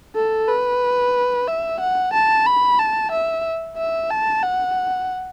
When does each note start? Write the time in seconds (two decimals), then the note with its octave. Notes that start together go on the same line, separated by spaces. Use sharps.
0.15 A4
0.48 B4
1.48 E5
1.80 F#5
2.13 A5
2.46 B5
2.79 A5
3.12 E5
3.77 E5
4.11 A5
4.43 F#5